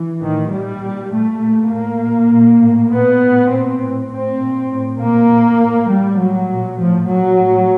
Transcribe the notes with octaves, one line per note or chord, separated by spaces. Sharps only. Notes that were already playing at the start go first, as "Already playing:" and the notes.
Already playing: E3
A2 D#3
A#2 G3
A#2
A#2 A3
A#2
A2 A#3
A#2
A#2
A2
A#2 B3
A2
A#2 C4
A2
A2 C4
A#2
A2
A#2 A#3
A#2
A2
A2 G3
A2 F#3
A#2
A2 F3
A#2 F#3
A2